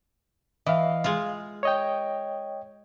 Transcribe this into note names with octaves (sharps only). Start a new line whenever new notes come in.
E3 D#5 F5
G#3 F4
C#5 D#5 G5